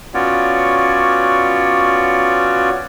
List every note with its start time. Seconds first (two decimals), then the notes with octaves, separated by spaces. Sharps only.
0.14 B3 C#4 F4 F#4 C#5 D5